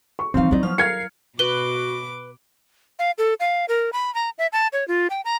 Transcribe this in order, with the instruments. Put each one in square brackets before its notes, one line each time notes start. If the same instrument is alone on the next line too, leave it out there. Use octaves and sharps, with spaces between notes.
[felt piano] C#6
[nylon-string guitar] C#3 D#4 F5 [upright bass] E3 F3 [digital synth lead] C4
[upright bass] F#3 E4 [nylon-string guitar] D#4 D5 D#5
[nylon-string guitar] F3 B3 [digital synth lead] F6
[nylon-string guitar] A#4 F5 [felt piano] F6 G#6 C#7 [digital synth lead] C7
[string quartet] B2 D6 [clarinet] F#4 [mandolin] B4 [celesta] G7
[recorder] F5
A4
F5
A#4
B5
A#5
E5
A5
C#5
F4
G5
A#5